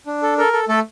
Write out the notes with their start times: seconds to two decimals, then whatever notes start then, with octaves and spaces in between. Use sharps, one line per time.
0.06 D4
0.23 A4
0.38 A4 A#4
0.53 A4
0.69 A3 A4